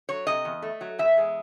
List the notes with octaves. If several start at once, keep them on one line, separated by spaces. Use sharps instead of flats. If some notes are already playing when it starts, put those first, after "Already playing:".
F#3 C#5
C3 D#5
E2
A3
F#3
E2 E5
G#3